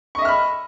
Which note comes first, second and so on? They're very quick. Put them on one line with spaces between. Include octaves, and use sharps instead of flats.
C#6 D#5 E5 F6 B5